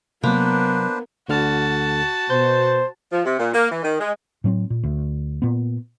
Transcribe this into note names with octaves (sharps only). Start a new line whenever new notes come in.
C3 F#3 A#3 B3 D4 B4 C5
D2 D3 F#4 A5 F6
B2 C5 G6
F3
C3
A#2
A#3
E3
D#3
G#3
A2 F#3 B3 C4
A#2
D2
A#2 B3